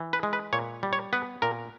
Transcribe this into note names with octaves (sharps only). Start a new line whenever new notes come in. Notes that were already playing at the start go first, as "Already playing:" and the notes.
Already playing: E3
B4
G#3
B4
A#2 C#5
G3
C#5
B3 B4
A#2 A#4